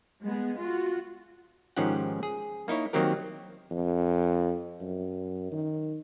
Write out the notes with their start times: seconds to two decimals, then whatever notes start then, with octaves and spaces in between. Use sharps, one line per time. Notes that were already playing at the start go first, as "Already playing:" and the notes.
0.24 G#3 B3 G#4
0.56 F4 F#4
1.77 G#2 D#3 F3 C#4 G4 F#5
2.23 G#4
2.68 A#3 D#4 E4 C#5
2.93 D#3 F#3 A#3 C4 G4 A#4
3.71 F2
4.81 F#2
5.52 D#3